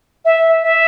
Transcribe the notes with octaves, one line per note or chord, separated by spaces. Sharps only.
E5
E5